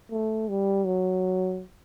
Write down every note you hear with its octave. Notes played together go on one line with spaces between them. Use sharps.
A3
G3
F#3